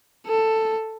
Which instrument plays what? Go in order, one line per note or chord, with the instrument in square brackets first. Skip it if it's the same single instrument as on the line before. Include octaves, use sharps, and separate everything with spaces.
[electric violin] A4